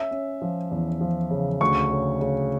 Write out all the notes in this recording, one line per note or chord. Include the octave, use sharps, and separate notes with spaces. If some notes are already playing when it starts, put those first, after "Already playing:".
Already playing: C#4 E5
C#4
F3
E2
F3
C#3
D2 C#6
C#3
C#3